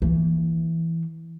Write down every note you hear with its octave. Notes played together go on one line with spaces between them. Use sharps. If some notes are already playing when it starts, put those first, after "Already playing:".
E3 A#3